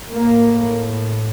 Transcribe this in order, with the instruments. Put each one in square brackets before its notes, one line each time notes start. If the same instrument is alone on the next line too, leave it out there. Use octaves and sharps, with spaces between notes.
[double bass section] A2 A#3